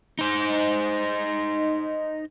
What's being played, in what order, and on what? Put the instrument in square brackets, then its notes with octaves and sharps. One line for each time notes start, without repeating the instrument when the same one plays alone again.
[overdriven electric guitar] D#4 C5